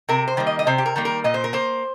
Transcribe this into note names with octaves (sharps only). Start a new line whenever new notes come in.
C3 A#4
C5
D#3 G3 A#3
D#5
D#5
C3 C5
G4
A#4
D#3 G3 A#3
A#4
A#2 D#5
C5
A#4
A#3 C5